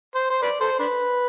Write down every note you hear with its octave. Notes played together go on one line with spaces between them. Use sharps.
C5
C5
B4 D5
A4 C5
D4 B4